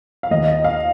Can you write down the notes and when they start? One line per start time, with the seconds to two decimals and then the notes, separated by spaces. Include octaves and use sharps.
0.23 F5
0.31 D#2 D#3 D#5
0.48 D#5
0.64 F5